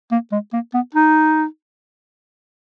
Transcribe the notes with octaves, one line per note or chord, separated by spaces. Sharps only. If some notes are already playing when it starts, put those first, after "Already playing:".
A#3
G#3
A#3
B3
D#4